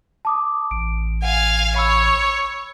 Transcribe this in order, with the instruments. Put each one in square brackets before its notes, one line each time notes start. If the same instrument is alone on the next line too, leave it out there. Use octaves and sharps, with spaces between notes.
[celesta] A5 D6 D#6
[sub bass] A1 [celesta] D7
[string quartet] F5 G#5 [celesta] F#5
[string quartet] C#5 [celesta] B5 E6